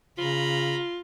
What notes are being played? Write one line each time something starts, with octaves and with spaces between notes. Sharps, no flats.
C#3 F4 A#5 B5